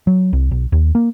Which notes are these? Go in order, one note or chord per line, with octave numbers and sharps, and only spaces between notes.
F#3
C2
B1
D#2
A#3